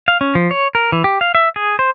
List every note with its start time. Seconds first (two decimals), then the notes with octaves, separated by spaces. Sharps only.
0.08 F5
0.21 C#4
0.35 F3
0.51 C#5
0.75 A#4
0.92 E3
1.04 G4
1.21 F5
1.35 E5
1.56 G#4
1.79 C5